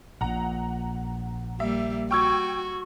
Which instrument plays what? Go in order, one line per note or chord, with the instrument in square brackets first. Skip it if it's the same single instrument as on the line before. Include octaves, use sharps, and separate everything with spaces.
[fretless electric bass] A#1 A#2 [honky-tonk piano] F#5 A#5
[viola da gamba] G3 A#3 [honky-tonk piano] E5
[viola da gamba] F#4 [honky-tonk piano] G5 E6 G#6 [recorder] C#6